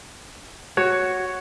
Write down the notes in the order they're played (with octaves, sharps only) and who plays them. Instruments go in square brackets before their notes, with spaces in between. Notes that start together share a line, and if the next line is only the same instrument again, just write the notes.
[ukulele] F#4 [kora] C#5